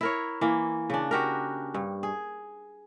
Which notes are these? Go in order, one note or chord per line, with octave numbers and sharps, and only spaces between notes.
E4 A#4 C#5
E3 A#3
C#3 D4
F#4 G4 A#4
G2
G#4